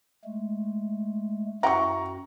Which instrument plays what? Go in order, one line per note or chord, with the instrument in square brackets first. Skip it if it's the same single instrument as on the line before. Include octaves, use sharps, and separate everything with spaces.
[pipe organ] G#3 A3
[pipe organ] F#2 F#4 [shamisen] E4 F#5 G5 [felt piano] A#5 C#6